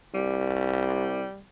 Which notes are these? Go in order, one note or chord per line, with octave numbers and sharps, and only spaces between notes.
C2 G3